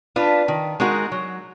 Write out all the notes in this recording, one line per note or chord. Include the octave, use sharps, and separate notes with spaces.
D4 F4 B4
D#3
G#3 D#4 F#4 A#4
F#3